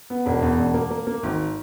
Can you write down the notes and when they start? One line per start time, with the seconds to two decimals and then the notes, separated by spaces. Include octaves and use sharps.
0.10 B3
0.26 E1
0.42 E2
0.59 E1
0.74 A#3
0.90 A#3
1.07 A#3
1.23 G#1